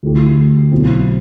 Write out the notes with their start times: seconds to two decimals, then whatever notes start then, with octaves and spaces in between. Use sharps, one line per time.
0.03 D2 D3 A3 E4 G4
0.72 B1 B2 F#3 C4 E4